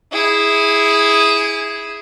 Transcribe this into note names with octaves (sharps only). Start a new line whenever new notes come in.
E4 G#4